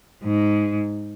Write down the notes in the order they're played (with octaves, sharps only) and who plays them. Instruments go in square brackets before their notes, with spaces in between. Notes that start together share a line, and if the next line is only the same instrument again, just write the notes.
[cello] G#2